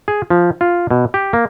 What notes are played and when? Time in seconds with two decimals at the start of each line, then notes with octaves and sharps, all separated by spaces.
0.08 G#4
0.30 F3
0.61 F4
0.91 B2
1.14 G4
1.33 A#3